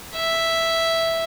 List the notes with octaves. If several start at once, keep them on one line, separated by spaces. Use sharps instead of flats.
E5